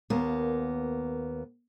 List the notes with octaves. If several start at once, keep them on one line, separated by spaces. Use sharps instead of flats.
D#2 A#3 B3